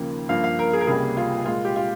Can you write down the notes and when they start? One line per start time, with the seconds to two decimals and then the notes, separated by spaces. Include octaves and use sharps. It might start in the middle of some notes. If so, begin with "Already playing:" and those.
Already playing: D#2 C#3 F3 A#3
0.29 G2 F3 A#3 F5
0.44 F5
0.59 A#4
0.73 G#4
0.81 A#4
0.87 C#2 C3 G3 A#3 G#4
1.17 F4
1.46 A#2 G#3 F4
1.65 G4
1.76 F4